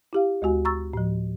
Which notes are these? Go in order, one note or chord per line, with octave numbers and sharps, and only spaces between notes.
E4 G4 F5
D2 G#3 F#4 G#5
A#5 C#6 E6 A6
A2 F3